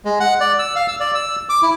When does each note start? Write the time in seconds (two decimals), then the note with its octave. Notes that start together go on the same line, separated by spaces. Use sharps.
0.05 G#3
0.20 F#5
0.40 D5
0.59 E6
0.76 F5
0.88 E6
1.00 D5
1.15 E6
1.49 D6
1.62 E4